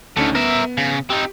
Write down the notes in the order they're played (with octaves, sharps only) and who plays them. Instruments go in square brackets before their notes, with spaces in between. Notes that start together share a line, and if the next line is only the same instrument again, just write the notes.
[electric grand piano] D2 C#4 D#4 [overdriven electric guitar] D3 A3
[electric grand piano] B3 [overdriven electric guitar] A#4 E5
[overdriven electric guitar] C#3
[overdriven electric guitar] C4 D#4 [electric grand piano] G4